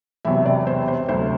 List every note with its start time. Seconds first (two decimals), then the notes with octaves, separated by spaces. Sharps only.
0.25 E1 E2 C3 F#3 E5
0.45 D5
0.67 C5
0.88 C5
1.09 D2 C3 F#3 C5